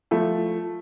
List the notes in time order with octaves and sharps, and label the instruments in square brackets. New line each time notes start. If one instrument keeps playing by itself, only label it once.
[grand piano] F3 A3